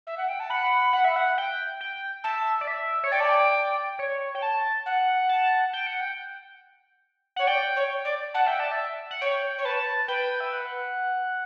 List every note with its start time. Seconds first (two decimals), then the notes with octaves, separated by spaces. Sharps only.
0.07 E5
0.18 F#5
0.29 G5
0.40 A5
0.50 F#5 B5
0.93 F#5
1.04 E5
1.16 F#5
1.38 G5
1.81 G5
2.24 E5 A5
2.61 D5
2.67 E5
3.03 C#5
3.12 D5 G5
3.20 A5
3.29 G5
3.99 C#5
4.35 G5
4.42 A5
4.86 F#5
5.29 A5
5.73 G5
5.87 F#5
6.01 G5
7.36 C#5 F#5
7.47 D5 G5
7.76 C#5
8.05 D5
8.34 F#5 A5
8.47 E5 G5
8.59 D5 A5
8.71 E5
9.11 F#5
9.21 C#5 G5
9.58 C#5
9.65 B4 A5
10.08 B4 G5
10.40 E5
10.53 F#5